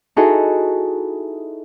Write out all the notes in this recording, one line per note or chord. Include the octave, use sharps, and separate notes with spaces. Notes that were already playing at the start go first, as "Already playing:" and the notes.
D#4 E4 F#4 G#4 A4